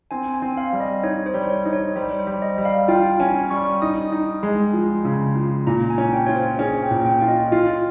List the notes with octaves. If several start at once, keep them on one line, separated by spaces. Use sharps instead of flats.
C4 G#5
G#5
C4
F5
G3
D#5
D#4 C#5
C5
G3 C#5
C5
C#5
D#4
C#5
G3 C5
C5
G3
D#5
G3
F5
F4 G5
C#4 G#5
G3 C#6
D#4 D#6
D#4
G#3
F3
C#3
F3
A#2 A#5
G#5
C#4
G5
F4 C#5
C5
C#4 G#4
G5
A#2
G5
F4
D#5
F4